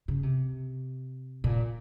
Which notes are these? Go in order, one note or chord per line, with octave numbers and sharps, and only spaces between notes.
C#3
C3
A#2